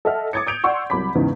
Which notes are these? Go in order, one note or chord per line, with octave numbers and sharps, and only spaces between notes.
A4 D#5 E5 F#5 F6
D6 D#6 G#6 A6 C#7
D#6 G6 D7 F7
D5 F#5 C6 C#6 E6
C2 F#3 B5 D6 B6
E2 G#2 C#3 E3